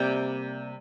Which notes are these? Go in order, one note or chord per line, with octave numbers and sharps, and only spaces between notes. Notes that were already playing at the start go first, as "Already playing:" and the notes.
Already playing: C3 G3 A#3 D5 F5 G5